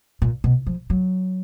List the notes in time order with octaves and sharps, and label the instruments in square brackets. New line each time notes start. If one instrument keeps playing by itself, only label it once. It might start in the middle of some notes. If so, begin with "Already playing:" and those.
[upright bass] A#2
B2
F3
F#3